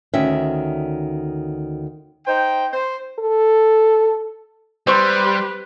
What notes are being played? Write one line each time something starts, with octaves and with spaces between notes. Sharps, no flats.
D2 D#3 C#4 E5
D#4 C5 G5
C5
A4
G3 C4 G4 B4 C6 C#6